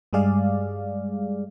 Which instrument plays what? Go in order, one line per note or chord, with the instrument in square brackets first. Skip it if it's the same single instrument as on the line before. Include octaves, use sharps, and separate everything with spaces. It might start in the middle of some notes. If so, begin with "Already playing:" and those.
[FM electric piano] G2 G3 G#3 G#4 D5 F5